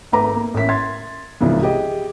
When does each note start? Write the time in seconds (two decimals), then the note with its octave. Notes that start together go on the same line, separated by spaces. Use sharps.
0.12 G#1 A3 B4 A#5 D6
0.35 A#3
0.54 A1 C#4 A#4 E5 B6
0.69 C6 G#6 A6
1.40 C2 G#2 C#3 E3 F3
1.63 G4 G#4 D#5